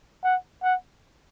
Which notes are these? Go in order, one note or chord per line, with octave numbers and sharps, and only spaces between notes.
F#5
F#5